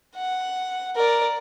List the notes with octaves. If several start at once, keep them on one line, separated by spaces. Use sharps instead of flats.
F#5
A#4 D5